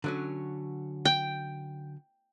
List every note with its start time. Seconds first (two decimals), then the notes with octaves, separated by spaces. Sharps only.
0.04 D3 F#3 C#4
1.05 G5